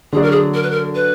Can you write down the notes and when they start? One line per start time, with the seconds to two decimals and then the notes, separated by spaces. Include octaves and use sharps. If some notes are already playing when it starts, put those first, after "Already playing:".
0.13 D3 F#3 D4 G#4
0.22 A#4
0.31 G#4
0.54 A#4
0.63 B4
0.71 A#4
0.95 B4